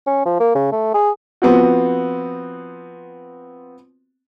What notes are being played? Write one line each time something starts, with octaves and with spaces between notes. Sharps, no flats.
C#4
F3
A#3
C#3
A3
G#4
F3 B3 C4 F#4